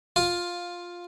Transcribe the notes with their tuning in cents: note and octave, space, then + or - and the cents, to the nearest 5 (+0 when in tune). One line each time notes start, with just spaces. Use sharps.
F4 +10